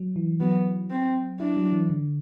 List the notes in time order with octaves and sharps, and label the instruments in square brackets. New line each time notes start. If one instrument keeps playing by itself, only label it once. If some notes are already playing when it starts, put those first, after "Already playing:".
Already playing: [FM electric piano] F#3
E3
[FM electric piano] F#3 [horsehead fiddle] B3
[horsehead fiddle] C4
[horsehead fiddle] D4 [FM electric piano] E4
[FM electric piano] F#3
E3
D3